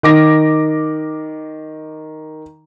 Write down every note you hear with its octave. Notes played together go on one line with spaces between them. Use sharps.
D#3 D6 A#6